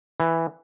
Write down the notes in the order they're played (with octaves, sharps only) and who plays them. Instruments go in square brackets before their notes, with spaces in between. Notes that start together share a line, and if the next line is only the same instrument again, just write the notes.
[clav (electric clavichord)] E3